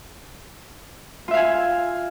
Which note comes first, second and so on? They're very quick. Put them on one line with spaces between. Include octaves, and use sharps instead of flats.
F4 E5 F5 G#5